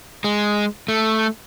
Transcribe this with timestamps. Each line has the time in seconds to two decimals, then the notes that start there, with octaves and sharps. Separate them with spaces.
0.24 G#3
0.88 A3